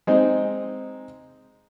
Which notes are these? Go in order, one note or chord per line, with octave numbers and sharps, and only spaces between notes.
G#3 C4 D#4